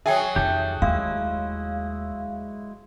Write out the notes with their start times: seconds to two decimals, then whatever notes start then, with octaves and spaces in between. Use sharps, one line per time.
0.06 F#3 G#4 E5 G5
0.36 F2 D#4 G4 A4
0.82 D#2 G#3 A3 E4 F5